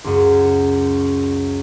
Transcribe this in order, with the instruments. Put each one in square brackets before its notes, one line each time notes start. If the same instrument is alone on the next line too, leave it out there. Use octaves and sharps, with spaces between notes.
[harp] C#2 F#2